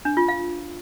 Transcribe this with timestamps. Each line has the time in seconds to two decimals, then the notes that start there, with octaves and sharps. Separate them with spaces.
0.05 D4
0.17 F4
0.28 F5